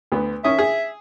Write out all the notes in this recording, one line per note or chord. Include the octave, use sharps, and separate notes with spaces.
D2 B3
D#3 C#4 E5 D#6
G#4